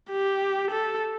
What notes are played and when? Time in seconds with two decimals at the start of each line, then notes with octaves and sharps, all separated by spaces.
0.11 G4
0.71 A4